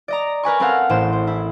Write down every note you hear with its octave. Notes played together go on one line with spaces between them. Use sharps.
D5 D#5 A#5
A#4 B4 G#5 C#6
C4 C#4 A4 A#4 F5 F#5
A1 A2 C5 E7
C5
E4